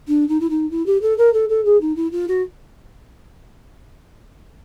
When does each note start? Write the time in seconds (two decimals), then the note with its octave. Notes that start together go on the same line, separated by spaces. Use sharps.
0.08 D4
0.28 D#4
0.40 E4
0.49 D#4
0.70 E4
0.86 G4
1.01 A4
1.18 A#4
1.33 A4
1.49 A4
1.65 G#4
1.81 D#4
1.95 E4
2.11 F4
2.28 F#4